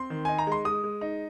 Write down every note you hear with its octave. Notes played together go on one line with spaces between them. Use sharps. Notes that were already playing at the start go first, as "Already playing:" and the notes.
Already playing: C4 C6
D#3
D#4 G#5
A#5
G#3 C6
G#3 D#6
G#3
D#4